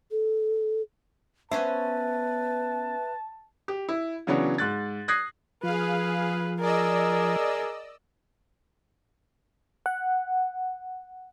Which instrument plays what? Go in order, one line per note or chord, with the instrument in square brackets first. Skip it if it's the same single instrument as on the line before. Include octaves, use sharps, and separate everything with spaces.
[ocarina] A4
[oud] B3 C#4 C5 [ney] B4 [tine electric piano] E5 [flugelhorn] A5
[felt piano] G4
E4
C#3 E3 F#3 B3 C#4 D4
G#2 F#6 A6
D#6 F#6 G#6 A#6 C7
[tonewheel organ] F3 [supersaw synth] G#4 F5 [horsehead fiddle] B4
[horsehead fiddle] G#4 A#4 [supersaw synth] D5 D#5 E6
[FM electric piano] F#5